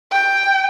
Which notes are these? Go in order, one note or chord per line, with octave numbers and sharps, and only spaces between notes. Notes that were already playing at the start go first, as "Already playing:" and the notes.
G5